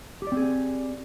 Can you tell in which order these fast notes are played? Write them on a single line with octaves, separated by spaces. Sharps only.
G4 D5 C4 G#4